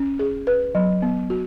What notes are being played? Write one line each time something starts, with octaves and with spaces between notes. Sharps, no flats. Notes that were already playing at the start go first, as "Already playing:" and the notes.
Already playing: C#4
G#4
B4
F#3
B3
F#4